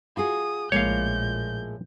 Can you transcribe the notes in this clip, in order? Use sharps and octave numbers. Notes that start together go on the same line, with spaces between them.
F4 F#4 G#4 D#6
A#1 A2 G#3 A#3 C#5 F5 G6